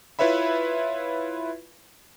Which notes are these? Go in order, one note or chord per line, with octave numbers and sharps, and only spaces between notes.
E4 F4 B4 C#5 E5 B5